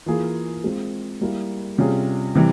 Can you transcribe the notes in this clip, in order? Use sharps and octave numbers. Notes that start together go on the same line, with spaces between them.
E3 A#3 F4 G#4
G#3 C4 F4
G3 A#3 E4
C3 G3 C#4 F4 G#4
C3 E3 G3